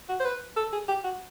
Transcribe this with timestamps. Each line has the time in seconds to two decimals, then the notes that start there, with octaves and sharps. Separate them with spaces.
0.09 F#4
0.19 C5
0.25 B4
0.56 A4
0.73 G#4
0.88 G4
1.04 F#4